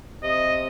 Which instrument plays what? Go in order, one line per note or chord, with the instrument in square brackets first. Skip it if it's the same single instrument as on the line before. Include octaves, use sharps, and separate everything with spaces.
[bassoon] C3 [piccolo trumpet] D#5